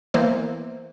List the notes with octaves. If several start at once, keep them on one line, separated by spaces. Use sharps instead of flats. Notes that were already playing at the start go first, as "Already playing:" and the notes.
E3 A#3 B3 E4 C5